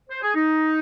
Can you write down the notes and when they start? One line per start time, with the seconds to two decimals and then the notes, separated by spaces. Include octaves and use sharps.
0.09 C5
0.22 G#4
0.34 D#4